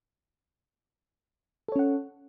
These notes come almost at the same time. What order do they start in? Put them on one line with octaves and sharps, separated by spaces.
A4 C#5 C#4 F#5